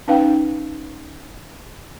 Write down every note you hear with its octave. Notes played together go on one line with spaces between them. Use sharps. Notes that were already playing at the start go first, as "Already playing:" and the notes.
C#4 D#4 B4 F5 G5